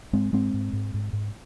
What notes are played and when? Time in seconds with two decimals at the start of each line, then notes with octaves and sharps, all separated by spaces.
0.13 G#2 G#3 C4
0.33 G#2 G#3 C4
0.54 G#2
0.73 G#2
0.94 G#2
1.13 G#2